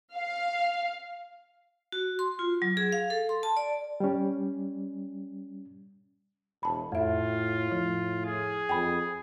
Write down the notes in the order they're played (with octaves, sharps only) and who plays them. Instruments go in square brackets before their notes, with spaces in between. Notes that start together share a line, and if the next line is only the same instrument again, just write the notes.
[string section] F5
[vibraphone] F#4
C6
F4
F#3
G#4
F5
A4
C6
A5
D5
[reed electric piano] G3 C#4
[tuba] E1 [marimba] A5 B5
[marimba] F2 E5 [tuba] A2 [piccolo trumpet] F4
[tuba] A2 [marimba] F3
[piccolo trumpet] G#4
[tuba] F2 [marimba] G5 G#5 B5